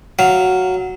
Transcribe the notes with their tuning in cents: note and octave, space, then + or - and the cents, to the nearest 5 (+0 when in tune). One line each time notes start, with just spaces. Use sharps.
F#3 +0 F5 +0